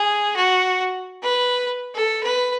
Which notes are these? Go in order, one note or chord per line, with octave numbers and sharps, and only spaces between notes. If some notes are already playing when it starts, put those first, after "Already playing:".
Already playing: G#4
F#4
B4
A4
B4